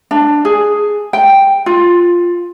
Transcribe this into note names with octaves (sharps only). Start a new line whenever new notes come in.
D4
G#4
G5
F4